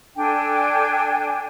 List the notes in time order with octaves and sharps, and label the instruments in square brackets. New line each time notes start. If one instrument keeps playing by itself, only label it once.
[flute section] D4 A4 G5 G#5